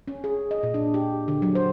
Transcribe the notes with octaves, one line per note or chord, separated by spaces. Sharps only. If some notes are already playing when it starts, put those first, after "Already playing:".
C#4
G#4
D#5
A#2
D4
G4
D3
F#3
C5